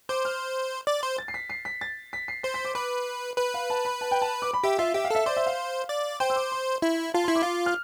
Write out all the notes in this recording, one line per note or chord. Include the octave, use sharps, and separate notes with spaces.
C5 D6
F6
D5
C5
A6
C7
B6
C7
B6
A6
B6
C7
C5 C7
B6
D6
B4 D6
B4 B5
F5
A5
B5
A5
G5
A5
D6
B5
G4 E5
F4 E5
G4 E5
F5
A4 E5
C5 D5
E5
F5
D5
C5 G5
E6
D6
C6
E4
F4 A5
E4 C6
D6
F4
F6